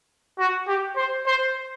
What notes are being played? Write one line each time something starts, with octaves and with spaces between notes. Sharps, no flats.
F#4
G4
C5
C5